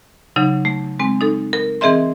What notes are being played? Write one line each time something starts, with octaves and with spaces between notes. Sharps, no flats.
C#3 F#3 D#4
A3
G#3 C4
D#4 A4
A#4
E3 C4 G#4 D#5 E5 C6